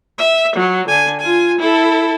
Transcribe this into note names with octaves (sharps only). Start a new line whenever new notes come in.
E5
F#3
D3 G#5
F4 G#5
E4 A4